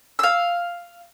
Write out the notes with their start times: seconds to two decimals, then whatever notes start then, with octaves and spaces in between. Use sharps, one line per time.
0.19 F5 E6